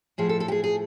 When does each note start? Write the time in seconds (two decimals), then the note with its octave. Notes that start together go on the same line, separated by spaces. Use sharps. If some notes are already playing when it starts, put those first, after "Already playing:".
0.18 A2 F3 G#4
0.29 A4
0.40 A4
0.48 G4
0.52 G#4
0.64 G#4